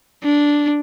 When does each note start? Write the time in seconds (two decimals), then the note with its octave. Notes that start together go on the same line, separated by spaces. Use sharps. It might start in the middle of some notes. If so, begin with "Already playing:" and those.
0.23 D4